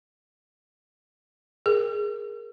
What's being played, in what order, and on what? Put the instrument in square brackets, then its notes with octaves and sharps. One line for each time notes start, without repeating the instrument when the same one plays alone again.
[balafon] G#4 [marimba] A#4